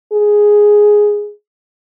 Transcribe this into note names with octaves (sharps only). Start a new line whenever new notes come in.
G#4